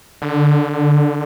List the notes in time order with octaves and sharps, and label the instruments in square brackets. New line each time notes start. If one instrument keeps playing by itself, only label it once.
[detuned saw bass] D3